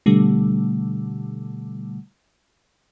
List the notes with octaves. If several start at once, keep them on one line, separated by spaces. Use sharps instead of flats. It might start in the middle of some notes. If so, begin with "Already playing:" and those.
B2 D3 G3 A3